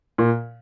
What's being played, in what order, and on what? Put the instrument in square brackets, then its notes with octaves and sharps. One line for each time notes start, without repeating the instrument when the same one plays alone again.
[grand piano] A#2